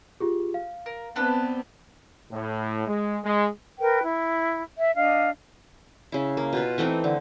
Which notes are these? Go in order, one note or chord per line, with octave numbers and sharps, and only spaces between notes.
F4 G4 G#4
F5
A#4
B3 C4 D4 A4 B4
A2
G#3
G#3
A#4 B4 G5
E4
E5
D4 D#5 F5
C#3 E4
A#3
B2 F4 B4
E3 A3 C4 D#4
D3